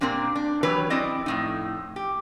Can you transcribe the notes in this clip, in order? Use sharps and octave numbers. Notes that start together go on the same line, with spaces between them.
A#2 A#3 C4 D4 G4
D4
E3 F#3 G4 B4 C#5
C4 E4 D5 D#5
F2 A2 D#4
G4